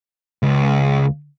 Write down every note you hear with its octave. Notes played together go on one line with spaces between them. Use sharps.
C#2